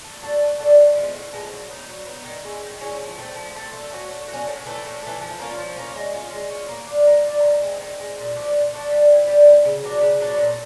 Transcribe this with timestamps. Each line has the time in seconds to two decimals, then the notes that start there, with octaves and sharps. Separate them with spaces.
0.04 A3
0.22 D4 F#4 A4
0.41 A3
0.59 D4 F#4 A4
0.78 A2
0.95 F3 G#3 B3
1.14 A2
1.33 F3 G#3 B3
1.51 F#3
1.70 B3 D#4
1.89 F#3
2.06 B3 D#4
2.25 D#3
2.44 G#3 C#4 E4
2.63 D#3
2.81 G#3 C#4 E4
3.00 F3
3.18 A3 C4
3.36 F3
3.55 A3 C4
3.73 A3
3.92 C#4 F#4
4.11 A3
4.28 F#4
4.34 C#4
4.47 A2
4.66 E3 A3
4.85 A2
5.02 E3 A3
5.21 F3
5.39 A#3 C#4 F4
5.58 F3
5.76 A#3 C#4 F4
5.96 G#3
6.13 C#4 F4
6.33 G#3
6.50 C#4 F4
6.69 A#3
6.87 D4 F4
7.07 A#3
7.24 D4 F4
7.43 D#3
7.61 G#3 C4
7.79 D#3
7.98 G#3 C4
8.18 A#2
8.35 F3 A3 D4
8.54 A#2
8.72 F3 A3 D4
8.91 G3
9.09 C4 E4
9.27 G3
9.46 C4 E4
9.65 C#3
9.84 F#3 B3 D4
10.01 C#3
10.20 F#3 B3 D4
10.38 A#2